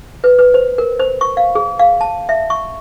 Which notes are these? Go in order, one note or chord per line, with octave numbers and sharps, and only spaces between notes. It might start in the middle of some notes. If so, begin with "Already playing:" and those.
B4
B4
C5
A#4
C5
C#6
F5
G#4
F5
A5
E5
C#6